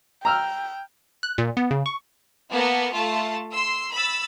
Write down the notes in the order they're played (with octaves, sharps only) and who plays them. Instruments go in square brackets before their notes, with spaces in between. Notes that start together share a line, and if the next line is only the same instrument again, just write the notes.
[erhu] G5 [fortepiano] A#5 E6 F6
[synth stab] F#6
A#2
B3
C#3
C#6
[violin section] A#3 B3 A5
A3 F4 A5
C6 E6
B5 E6 A6